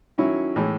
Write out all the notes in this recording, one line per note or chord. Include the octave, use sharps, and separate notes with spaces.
D#3 F#3 C#4 E4
A2 E3 G#3